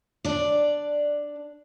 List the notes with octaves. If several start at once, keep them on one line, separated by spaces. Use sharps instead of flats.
D4 D5